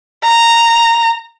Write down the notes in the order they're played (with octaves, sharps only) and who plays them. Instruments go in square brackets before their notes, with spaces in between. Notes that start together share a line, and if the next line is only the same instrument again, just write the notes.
[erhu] A#5